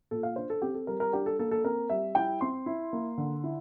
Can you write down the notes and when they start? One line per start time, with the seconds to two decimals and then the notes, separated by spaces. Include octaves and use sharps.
0.11 A#2 A4
0.23 F5
0.36 D4 C5
0.50 A4
0.62 C4 G4
0.74 A4
0.87 G3 A#4
1.00 A#4
1.13 D4 G4
1.26 A4
1.39 A#3 A4
1.51 A4
1.64 C4 A#4
1.90 G3 E5
2.15 E4 G5
2.41 C4 C6
2.66 E4
2.93 A#3
3.18 D3
3.44 E4